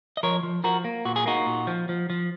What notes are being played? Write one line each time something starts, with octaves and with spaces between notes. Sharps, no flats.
D#5
F3 A#4 C#5
F3
F3 F#4 A#4
A#3
A#2 F#4
G#4
A#3 D#4 F#4
A#2
F3
F3
F3